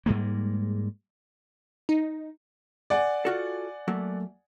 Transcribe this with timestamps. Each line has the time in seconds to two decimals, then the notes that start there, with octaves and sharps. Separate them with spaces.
0.06 G#2 G3 G#3 A#3
1.89 D#4
2.90 D5 F#5 G#5
3.25 F4 F#4 A4
3.88 F#3 A3 A#3